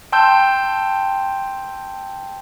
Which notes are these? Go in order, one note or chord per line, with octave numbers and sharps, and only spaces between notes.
G5 A5 C6 E6 G6